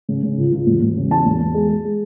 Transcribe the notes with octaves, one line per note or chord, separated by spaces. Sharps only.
C#3
C#3
C#2
C#2
E1
E1
C#3
E2 A5
E1
E1
G#3
G#3
G#3